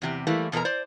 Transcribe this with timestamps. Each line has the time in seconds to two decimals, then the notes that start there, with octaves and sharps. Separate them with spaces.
0.02 E2 C3 G4
0.27 E3 G3 A3 A#3
0.52 E2 B2 A4 A#4 A#5
0.65 C5 D5